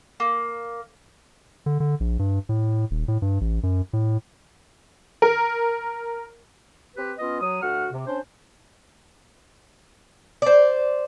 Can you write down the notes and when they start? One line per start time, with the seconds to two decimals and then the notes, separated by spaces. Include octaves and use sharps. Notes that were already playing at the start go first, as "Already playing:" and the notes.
0.20 A#3
1.66 D3
1.80 D3
2.00 A#1
2.19 G2
2.49 A2
2.91 D#1
3.08 A2
3.22 G2
3.41 A1
3.63 F#2
3.93 A2
5.22 A#4
6.96 C4 G4 B4
7.18 B3 C#4 F4 D#5
7.40 F#3 D#6
7.61 D2 F#4 F#5 F6
7.92 C3
8.07 C#4 D4 C5
10.42 C5 D5